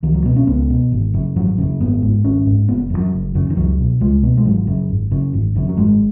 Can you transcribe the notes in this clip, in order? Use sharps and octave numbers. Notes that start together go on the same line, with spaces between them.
C#2 D#3
F#3
B2 B3
C#4
C#2 B3
B2
G#1
F#2 C#3
G#1 F#3
F#2 C#3
G#1 B3
G#2
G#1 C#4
G#2
F#1 B3
F#2 C#3
F#3
F#1
F#2 C#3
D#3
C#2 F#3
B2
C#2 G#3
B2 B3
G#3
G#1 F#3
F#2 C#3
G#1
F#2 C#3
G#1
F#2 C#3
F#3
G#1 G#3